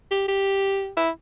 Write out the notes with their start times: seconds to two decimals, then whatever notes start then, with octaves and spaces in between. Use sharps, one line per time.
0.11 G4
0.28 G4
0.97 E4